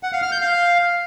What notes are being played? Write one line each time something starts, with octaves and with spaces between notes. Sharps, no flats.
F#5
F5
F6
G6
F5